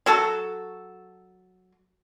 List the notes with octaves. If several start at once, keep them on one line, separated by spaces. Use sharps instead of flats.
F#3 F#4 A4